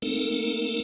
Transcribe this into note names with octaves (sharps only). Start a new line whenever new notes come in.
A3 A#3 C4 D#4 A4 A#4